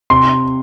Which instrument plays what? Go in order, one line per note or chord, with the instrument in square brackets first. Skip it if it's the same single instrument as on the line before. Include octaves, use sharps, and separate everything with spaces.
[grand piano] C3 C6